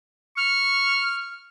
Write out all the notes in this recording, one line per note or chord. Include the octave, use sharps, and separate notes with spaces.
C#6 F6